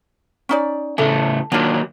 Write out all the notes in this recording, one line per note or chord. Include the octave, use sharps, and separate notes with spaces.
C#4 D#4 D5
A2 C#3 A3 A4
D#3 F#3 A#3 D4 F4